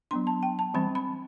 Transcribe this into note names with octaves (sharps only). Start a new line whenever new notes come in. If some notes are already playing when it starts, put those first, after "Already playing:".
F#3 B3 D4 C6
A5
G5
A5
E3 G3 C4 B5
B5